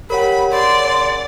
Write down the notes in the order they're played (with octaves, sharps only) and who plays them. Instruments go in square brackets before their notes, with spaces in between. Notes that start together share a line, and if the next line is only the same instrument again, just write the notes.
[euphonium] G4 [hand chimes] A#4 C#5 F#5 [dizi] B5
[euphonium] C#3 [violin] D5 [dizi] C6